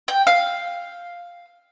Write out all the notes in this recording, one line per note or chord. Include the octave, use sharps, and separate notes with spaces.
G5
F5